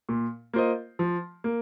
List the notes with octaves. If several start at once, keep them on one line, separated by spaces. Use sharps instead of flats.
A#2
A#3 F4 C5 D#5
F3
A#3